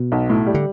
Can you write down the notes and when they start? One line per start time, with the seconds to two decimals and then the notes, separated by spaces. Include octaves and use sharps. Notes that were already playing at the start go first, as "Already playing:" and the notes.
Already playing: B2
0.12 B1
0.29 A2
0.46 G3
0.54 D3